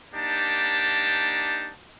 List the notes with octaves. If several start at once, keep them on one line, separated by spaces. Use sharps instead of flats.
A#3 D4 D#4 G4 A5